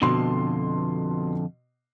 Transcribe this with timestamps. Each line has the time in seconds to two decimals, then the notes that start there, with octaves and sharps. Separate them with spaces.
0.02 F2 B2 D3 C6